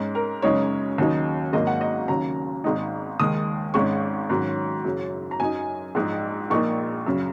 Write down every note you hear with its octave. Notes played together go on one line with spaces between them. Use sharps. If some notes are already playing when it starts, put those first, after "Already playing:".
Already playing: G#2 G#3 C#4
A#4
F#2 C#3 G#3 D#4 C#5
D#2 C#3 F#3 D#4
G#1 G#2 F#3 A#3 D#5
F#5
D#5
D#2 C#3 F#3 A#5
G#1 G#2 G#3 D#4
D#2 D#3 G#3 D#6
G#1 G#2 G#3 C#4 C#6
G#2 D#3 F#3 C#4
F#1 F#2 F#3 C#4
A#5
F#2 F#3 D#4 G#5
A#1 G#2 G#3 D#4
A#1 A#2 A#3 D#4 C#6
F#2 C#3 F#3